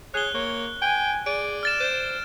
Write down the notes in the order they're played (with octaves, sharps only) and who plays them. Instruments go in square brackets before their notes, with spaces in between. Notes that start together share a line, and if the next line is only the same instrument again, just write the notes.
[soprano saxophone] G#4 [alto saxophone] C#5 [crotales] F#6 G7
[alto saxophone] A#3 [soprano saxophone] C#5
[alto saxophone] G5 [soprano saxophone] G#5
[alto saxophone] G#4 [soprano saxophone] D5 [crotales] D7
[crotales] F6 A6 E7
[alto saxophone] C5